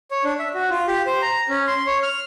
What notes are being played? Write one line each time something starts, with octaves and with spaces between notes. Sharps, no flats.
C#5
D4
E5
F#4
F4
G4
C5
A#5
C#4
C6
C#5
F6